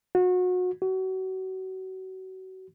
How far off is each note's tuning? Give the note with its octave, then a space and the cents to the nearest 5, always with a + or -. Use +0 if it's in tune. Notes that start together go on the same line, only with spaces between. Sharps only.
F#4 -30
F#4 +30